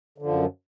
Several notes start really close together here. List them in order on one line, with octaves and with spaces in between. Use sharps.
D3 F3 F#2